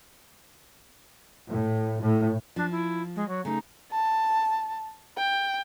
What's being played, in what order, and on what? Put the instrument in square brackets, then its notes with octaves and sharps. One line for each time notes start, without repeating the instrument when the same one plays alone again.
[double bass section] A2
A2
[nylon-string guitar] F3 [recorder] D4
[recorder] E4
G#3
F#3
[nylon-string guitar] C#3 A3 [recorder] D#4
[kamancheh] A5
G5